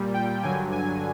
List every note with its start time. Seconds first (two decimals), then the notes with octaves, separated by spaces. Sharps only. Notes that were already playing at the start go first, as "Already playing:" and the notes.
Already playing: A#2 G3
0.14 G5
0.43 G2 D3 F#3 G#5
0.72 G#5